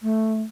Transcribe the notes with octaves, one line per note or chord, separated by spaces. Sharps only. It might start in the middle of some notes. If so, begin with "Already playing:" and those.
A3